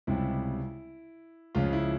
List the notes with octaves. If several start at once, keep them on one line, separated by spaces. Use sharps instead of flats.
C#2 C3 G3 E4
C#2 C#3 F3 F4
E4